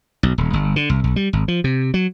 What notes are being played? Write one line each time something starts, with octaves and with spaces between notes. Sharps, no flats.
B1
D#1
G1
D3
C2
B1
G3
G#1
F3
C3
F#3